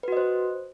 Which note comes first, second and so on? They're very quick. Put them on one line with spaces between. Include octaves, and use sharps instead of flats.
B4 F#4 D#5 C5